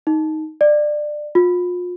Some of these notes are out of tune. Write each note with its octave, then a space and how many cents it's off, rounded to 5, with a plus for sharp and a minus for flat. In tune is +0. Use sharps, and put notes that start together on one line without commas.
D#4 +5
D5 +20
F4 +35